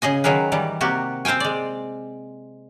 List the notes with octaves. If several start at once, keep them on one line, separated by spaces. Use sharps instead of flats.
C#3 G#4 D#5 G#5
D#3 F#3 G#4 A#4 B4
D#3 E3 G3
C3 A#3 F#4 G4
C4 C5 F5 G5 G#5
G#3 D5